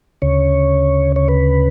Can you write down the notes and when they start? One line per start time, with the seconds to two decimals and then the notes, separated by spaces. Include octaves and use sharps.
0.22 D2 C#3 C#5
1.16 C#5
1.29 B4